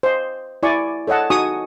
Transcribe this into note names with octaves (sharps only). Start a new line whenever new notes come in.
C5 D#5
E4 D5 G#5 C#6
A4 C#5 D#5 F#5 A5
D#4 F#4 G#5 C#6 D#6